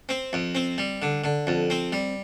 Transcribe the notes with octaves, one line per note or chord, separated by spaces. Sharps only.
C4
F2
C4
G3
D3
D3
F2
C4
G3